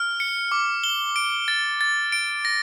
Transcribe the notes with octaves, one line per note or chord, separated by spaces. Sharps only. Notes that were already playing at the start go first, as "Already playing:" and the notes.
Already playing: F6
C#7
D6
G7
D7
A6
A6
D7
A#6